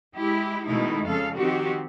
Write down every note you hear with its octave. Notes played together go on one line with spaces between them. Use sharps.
G#3 E4 G4
B2 D#3 G#3 A3 D#4 E4
F2 C#3 A4 F5
D#3 C4 F#4 G4